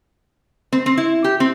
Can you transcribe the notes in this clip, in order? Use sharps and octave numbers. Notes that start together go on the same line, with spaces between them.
C4
C4
E4
G4
C4